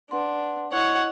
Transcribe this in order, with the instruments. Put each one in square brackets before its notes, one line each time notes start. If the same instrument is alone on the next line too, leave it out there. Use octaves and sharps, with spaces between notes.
[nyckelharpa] D4 [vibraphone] B4 F#5 C6
[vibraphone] E4 D#5 [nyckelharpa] C#5 F#5